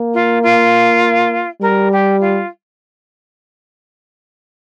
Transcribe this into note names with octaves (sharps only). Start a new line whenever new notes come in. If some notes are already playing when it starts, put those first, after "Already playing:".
Already playing: A#3
F4
F4
G3 A#4
G4
F4